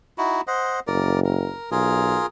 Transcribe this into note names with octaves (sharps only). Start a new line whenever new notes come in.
D#4 E4 F#4
C5 D#5 F#5
F#1 A#4 D5
A#4
B1 F4 G#4 A#4